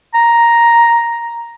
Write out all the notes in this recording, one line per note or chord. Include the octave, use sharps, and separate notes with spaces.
A#5